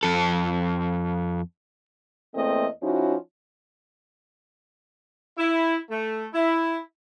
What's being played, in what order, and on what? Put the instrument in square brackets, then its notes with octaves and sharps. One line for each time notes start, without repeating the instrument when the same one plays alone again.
[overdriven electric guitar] F2 A4
[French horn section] E2 A3 A#3 C4 D#5
F3 C#4 D#4 E4 F#4
[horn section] E4
A3
E4